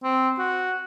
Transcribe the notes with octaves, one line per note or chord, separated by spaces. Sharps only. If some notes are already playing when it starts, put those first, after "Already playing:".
C4
F#4